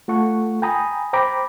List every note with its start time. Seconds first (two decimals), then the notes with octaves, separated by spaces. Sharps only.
0.08 A3 F4 A4 F#5 C#6
0.62 G5 G#5 A#5 B5 D#6
1.13 C5 G5 A#5 B5 D6